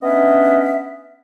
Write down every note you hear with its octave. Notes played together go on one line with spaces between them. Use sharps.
B3 C#4 D4 D#5 E5